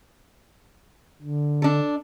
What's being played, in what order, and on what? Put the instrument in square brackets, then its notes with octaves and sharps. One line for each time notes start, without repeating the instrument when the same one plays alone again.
[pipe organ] D3
[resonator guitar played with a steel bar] D4 A4